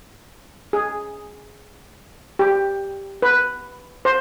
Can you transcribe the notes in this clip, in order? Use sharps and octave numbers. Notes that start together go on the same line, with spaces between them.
G#4
G4
B4
C5